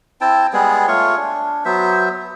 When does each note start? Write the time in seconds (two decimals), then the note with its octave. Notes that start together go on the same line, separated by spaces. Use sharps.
0.21 C4 E4 G5 A5
0.53 G3 G#3 B3 G#4
0.88 A3 F4 C#5 C#6
1.17 D4
1.65 F#3 B3 C5 E5